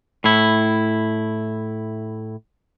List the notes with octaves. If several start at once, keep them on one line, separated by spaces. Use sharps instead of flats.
A2 E4